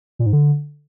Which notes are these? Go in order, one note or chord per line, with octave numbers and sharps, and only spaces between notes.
A#2
G#2
D3